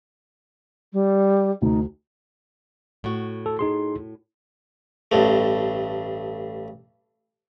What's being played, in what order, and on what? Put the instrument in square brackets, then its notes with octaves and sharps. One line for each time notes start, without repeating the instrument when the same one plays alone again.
[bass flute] G3
[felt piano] D2 [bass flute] D#4
[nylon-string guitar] A2 F#4
[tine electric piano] A4
D#4 G#4 C6
[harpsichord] A1 G2 A3